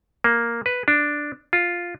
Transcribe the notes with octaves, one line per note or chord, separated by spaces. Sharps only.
A#3
B4
D4
F4